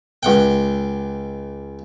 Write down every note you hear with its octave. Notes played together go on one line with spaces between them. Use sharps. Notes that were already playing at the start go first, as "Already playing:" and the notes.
C#2 F#5 G5